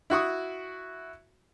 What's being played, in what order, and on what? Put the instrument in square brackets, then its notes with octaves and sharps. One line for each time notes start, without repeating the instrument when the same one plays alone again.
[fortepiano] E4 F#4 C#6 D#6